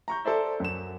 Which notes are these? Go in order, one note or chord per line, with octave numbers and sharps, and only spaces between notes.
A#5 C#6 G6
A4 C5 D5 E5
F#2 E7